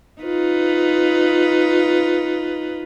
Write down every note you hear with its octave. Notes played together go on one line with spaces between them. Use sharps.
D#4 F4 B4